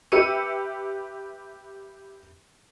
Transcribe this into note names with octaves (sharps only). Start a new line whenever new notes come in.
G4 B4 E5 E6 C#7 D#7